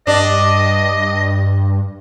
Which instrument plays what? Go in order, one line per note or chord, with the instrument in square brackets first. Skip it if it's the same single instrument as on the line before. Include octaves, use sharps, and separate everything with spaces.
[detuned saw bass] G2 [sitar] D4 [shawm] D#5